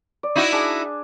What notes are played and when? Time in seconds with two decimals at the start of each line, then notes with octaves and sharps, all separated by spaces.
0.23 D5
0.36 D#4 E4 F#4
0.52 D4 G#4